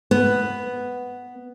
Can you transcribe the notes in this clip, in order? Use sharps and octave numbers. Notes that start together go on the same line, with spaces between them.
B3